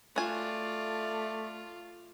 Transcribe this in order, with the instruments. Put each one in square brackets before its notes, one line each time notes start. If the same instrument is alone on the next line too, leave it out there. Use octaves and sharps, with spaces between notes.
[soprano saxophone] A3 [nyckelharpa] F4 [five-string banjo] F#4 G#5 [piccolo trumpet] D5